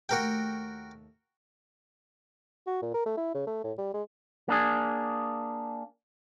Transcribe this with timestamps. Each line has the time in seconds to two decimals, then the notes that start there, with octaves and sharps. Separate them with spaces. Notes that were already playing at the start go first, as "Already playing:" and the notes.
0.09 D#2 A3 F#4 G4 A#4 G5
2.67 F#4
2.82 A#2
2.94 A#4
3.06 A3
3.17 E4
3.34 C#3
3.47 A3
3.64 A2
3.78 G3
3.94 G#3
4.48 A#3 D4 G#4